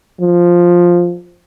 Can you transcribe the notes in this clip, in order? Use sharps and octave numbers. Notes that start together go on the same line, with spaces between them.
F3